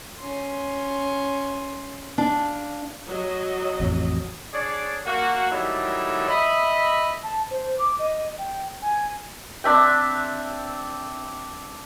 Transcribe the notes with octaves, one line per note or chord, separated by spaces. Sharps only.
C#4 C6
D4 F5
F#3 D#5
A1 F2
D4 G#4 C#5 D5
A#3 F#4
D#3 F#3 G3 A3 D#4 E4
D#5 E5 B5
A5
C5
D6
D#5
G5
G#5
C4 D4 E5 G5